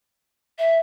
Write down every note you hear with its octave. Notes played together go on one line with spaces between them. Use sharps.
E5